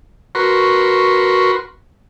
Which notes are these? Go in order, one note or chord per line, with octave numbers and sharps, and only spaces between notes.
F#4 A#4 B4 C6 C#6